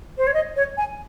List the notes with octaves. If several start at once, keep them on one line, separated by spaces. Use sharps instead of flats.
C5
C#5
D#5
C#5
G#5